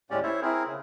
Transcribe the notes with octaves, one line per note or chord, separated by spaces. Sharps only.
D#2 A2 G#3 C#4 G4 D5
E4 C5 C#5 E5
C4 E4 G#4 A#4
C#3